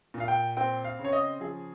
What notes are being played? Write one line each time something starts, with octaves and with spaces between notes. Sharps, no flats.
A#2
F5
G5
C4 G5
F5
C#3
C#5
D#5
F3 G#4